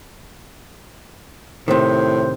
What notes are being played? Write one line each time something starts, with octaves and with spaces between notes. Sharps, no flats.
A2 C3 D#3 C5